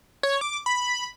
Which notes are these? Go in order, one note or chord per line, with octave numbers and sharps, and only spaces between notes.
C#5
D6
B5